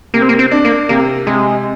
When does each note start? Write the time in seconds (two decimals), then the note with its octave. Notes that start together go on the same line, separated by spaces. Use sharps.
0.14 C3 A#3
0.22 C4
0.29 A#3
0.39 C4
0.51 D4
0.65 A#3
0.89 C3 A#3
1.26 C3 G#3